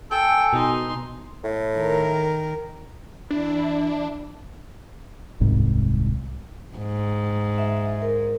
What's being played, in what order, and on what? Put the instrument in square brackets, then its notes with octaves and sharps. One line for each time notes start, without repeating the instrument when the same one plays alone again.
[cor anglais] A4 [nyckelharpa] G5 [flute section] G#5
[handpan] B2 [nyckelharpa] D#4 C6
[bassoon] A2
[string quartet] D#3 A#4
[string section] E3 E4 [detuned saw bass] D4
[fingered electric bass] D#1 C2 G#2 C4
[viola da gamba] G#2
[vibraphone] E5
A#4